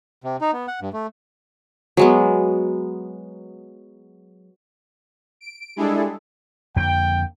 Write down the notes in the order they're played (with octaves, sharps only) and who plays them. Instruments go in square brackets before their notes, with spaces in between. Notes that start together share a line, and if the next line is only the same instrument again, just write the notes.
[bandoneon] C3
D#4
B3
F#5
G2
A3
[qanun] F#3 G#3 B3
[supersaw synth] D7
G3 G#3 D4 E4 G#4 A4
[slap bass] F2 D3 A#3 [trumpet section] G5